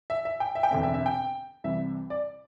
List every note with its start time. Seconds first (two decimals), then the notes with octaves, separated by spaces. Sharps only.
0.10 E5
0.25 E5
0.40 G5
0.55 E5
0.63 G5
0.71 E1 E2 D3 C4 E5
0.83 E5
0.94 E5
1.06 G5
1.64 C2 C3 E3 G3 E5
2.10 D5